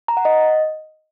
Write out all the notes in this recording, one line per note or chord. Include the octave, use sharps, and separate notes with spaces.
A#5
F#5
D#5